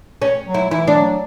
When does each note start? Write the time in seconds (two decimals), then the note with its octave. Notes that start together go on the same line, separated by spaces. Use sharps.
0.22 C#4
0.46 F#3
0.54 E4
0.70 E3 E4
0.87 D4
0.96 F#3